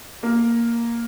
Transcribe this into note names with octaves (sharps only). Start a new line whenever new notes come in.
A#3 A#4